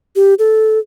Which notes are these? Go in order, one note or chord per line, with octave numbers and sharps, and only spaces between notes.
G4
A4